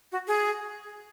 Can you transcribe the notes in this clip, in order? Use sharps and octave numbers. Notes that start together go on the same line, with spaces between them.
F#4
G#4